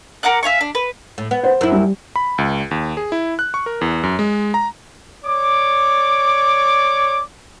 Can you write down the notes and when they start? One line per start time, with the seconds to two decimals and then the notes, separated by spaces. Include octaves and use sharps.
0.23 A#4 F#5 D6 F#6
0.43 E5 F5 G#5 C#6
0.61 D4
0.75 B4
1.18 A2
1.31 B3
1.44 C5
1.61 F#2 E4
1.72 G3
2.16 B5
2.38 C#2
2.71 D#2
2.97 G#4
3.12 E4
3.39 F#6
3.54 C#6
3.66 A#4
3.81 E2
4.03 F#2
4.19 G#3
4.54 A#5
5.25 C#5 D5 D6